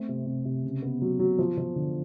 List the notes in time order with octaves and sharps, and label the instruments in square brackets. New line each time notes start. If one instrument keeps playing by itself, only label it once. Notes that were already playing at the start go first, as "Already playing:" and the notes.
Already playing: [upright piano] A3 C4
C3
C3
C3
C#3
B3
F#3
F#3
F3
F3
D3